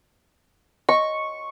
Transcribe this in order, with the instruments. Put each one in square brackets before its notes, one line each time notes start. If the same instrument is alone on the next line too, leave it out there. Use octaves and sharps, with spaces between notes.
[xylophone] D#5 [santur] C#6